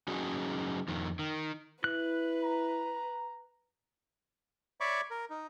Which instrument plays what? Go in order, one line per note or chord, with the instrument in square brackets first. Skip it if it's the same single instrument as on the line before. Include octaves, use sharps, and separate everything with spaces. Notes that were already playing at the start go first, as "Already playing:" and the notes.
[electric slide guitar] F#3 C#4 D#4 F#4 G#4
F2 D#3
D#3
[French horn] E4 [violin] B4 [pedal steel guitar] F#6
[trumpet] A#5
[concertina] C#5 D5 E5 B5 C#6 D6
A#4
D#4